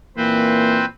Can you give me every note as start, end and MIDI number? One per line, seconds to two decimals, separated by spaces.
0.17 0.85 46
0.17 0.85 52
0.17 0.85 58
0.17 0.85 60
0.17 0.85 71
0.17 0.85 72